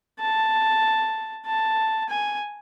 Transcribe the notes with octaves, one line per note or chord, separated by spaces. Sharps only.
A5
A5
G#5